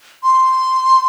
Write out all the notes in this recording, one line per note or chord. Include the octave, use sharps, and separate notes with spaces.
C6